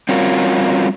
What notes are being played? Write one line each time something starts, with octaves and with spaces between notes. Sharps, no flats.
G3 C4 C#4 F4 F#4 A#4